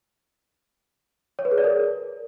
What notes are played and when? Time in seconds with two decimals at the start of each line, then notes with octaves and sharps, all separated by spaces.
1.39 C#5
1.45 B4
1.51 G#4
1.58 D5
1.64 A#4